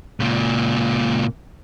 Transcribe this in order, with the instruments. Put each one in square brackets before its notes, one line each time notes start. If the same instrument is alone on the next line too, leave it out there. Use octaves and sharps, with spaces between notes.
[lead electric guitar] C#2 A#2